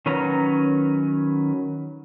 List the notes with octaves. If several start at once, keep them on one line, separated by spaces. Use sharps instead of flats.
D#3 F#3 C#4 B4 A#5